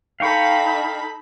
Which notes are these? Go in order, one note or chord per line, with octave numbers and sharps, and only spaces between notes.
D#4 A4 F5 G5 B5 C#6